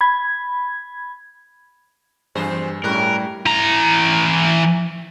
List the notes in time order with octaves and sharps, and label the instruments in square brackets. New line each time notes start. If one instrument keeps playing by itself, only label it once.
[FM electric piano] B5 G#6
[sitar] E2 G#4 C5 [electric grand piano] G2
[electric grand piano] A2 F#6 [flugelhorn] G3 [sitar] G#3 C#4 [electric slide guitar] A#4
[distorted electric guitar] E3 A#5